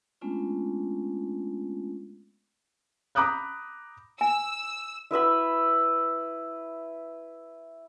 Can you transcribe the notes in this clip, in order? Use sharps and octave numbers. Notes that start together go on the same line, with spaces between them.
G#3 A3 B3 C#4 D4 F4
A#5 B5 D6 D#6 F#6 G6
G#5 E6
E4 B4 E5 B5